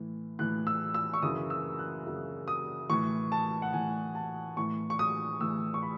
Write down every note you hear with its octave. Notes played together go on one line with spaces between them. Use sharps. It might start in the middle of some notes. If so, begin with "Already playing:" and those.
Already playing: A2 E3
A2 E3 F#6
E6
E6
C#6
F#2 C#3 E3 D#6
E6
F#6
F#2 C#3 E3
D#6
A2 E3 C#6
A5
F#5
A2 E3 G#5
A5
A2 E3 C#6
C#6
D#6
A2 E3 E6
C#6
B5